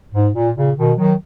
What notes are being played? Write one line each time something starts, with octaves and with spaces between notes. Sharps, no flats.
G#2
A#2
A#2 C#3
B2 D#3
D#3 F#3